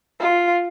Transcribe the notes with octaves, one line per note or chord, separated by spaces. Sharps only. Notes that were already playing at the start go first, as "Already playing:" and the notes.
F4